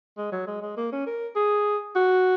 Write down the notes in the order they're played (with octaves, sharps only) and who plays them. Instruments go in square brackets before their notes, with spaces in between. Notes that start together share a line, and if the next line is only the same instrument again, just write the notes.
[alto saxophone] G#3
F#3
G#3
G#3
A#3
C#4
A#4
G#4
F#4